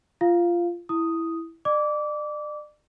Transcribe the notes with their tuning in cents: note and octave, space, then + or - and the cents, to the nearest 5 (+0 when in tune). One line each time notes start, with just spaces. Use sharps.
F4 -15 F5 +0
E4 +0 D#6 +0
D5 +35 D6 -20